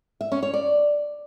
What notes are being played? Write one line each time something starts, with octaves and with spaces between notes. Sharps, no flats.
E5
C#4
C#5
D5